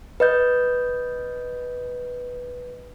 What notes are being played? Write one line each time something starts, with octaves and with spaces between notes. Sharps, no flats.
B4 D#5 G6